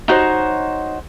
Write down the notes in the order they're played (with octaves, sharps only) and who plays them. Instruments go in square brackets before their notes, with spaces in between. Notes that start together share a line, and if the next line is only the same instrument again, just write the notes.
[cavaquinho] D#4 F#4 C5 C#5